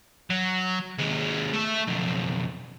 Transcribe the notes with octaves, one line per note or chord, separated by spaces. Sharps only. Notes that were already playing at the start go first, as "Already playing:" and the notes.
F#3
D#2 G#3
A3 E5
B1 F2